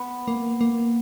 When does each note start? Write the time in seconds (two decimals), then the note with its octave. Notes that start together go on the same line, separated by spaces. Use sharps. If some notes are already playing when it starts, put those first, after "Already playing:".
Already playing: B3
0.28 A#3
0.61 A#3